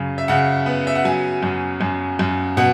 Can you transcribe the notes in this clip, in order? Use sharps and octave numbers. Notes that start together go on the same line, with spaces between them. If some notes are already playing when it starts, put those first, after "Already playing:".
Already playing: F#2 C#3
E5
C#3 F#5
B3
E5
F#5
F#3 G#5
F#2
F#2
F#2
B2 F#5